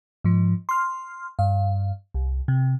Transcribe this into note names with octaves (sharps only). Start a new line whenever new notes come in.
G#2 F3
C6 F6
G2 F5
C2
C3